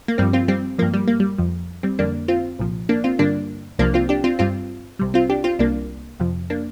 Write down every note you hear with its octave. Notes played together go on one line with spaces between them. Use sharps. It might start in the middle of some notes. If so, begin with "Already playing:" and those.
A#3
G2 F3 G3 C4
C4 F4
G3 C4
G2 F3 A#3
G3
A#3
G3
F2 F3
G3 C4
F2 D3 G3 A#3 D4
C4 F4
C2 A#2 F3
A#3 D4
C4 F4
G2 D3 G3 A#3 D4
C2 C3 F3 A#3 D4
C4 F4
D4 G4
C4 F4
G2 G3 C4 F4
C2 C3 G3
C4 F4
D4 G4
C4 F4
C2 C3 G3 A#3 D4
F2 C3 F3
A#3 D4